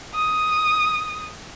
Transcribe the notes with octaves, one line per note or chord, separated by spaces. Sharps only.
D#6